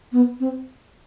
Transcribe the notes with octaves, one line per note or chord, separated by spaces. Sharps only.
B3
C4